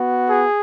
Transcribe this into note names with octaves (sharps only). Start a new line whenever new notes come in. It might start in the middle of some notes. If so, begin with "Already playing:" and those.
Already playing: B3 F#4
G#4